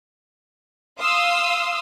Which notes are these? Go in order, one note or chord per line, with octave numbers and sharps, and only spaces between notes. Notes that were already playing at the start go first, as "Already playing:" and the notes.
F5 C6 D#6 E6